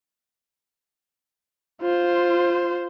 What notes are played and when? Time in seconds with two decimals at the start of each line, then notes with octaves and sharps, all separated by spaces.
1.82 F4 C5